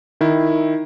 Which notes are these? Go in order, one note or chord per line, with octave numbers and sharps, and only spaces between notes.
D#3 E4